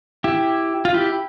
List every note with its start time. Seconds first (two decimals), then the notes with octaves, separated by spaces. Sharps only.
0.24 E4 G4
0.85 F4
0.94 E4 G4